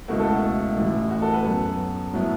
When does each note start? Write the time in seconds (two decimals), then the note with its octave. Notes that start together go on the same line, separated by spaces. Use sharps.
0.08 C#2 B2 A3 E4 F#4
0.20 A4
0.31 E4
0.77 A1 A2 E3
1.11 F#4
1.22 A4
1.34 B4
1.45 F#2 F#3 B3 A4
2.13 A2 F#3 B3 E4